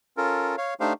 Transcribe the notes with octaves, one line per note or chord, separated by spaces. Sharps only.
C#4 F4 A4 A#4
C#5 F5
A3 D4 D#4 G4 C5 F5